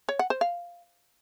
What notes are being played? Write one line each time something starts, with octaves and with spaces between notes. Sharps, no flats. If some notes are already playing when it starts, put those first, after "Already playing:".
C#5
F#5
C5
F5